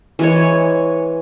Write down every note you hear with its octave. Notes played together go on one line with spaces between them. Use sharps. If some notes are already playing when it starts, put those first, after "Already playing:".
E3 G#3 C#5